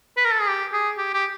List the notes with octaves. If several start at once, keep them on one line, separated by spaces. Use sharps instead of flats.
B4
A#4
A4
G#4
G4
G#4
G4
G4